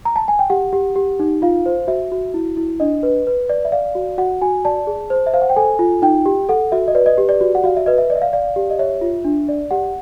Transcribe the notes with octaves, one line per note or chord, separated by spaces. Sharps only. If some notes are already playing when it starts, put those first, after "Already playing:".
A#5
A5
G#5
G5
G4 F#5
G4
G4
D#4
F4 F5
C5
F#4 E5
F#4
E4
E4
D4 D#5
B4
B4
D5
E5
D5 F5
F#4
F#4 F#5
F#4 G#5
D5 A5
G#4
C5
E5
C5 F5
F#5
G5
A4 G#5
F4
D#4 G5
G4
A4 F#5
F#4 E5
D#5
B4 D5
D#5
G4
D5
F#4
F#5
F#4 F5
E5
B4 D#5
E5
D5 D#5
E5
F5
D5 F5
G4
D#5
C#5 E5
F4
D4
D5
G4 F#5